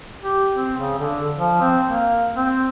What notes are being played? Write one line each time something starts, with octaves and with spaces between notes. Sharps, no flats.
G4
C4
C#3
D3
F3
C4
A#3
C4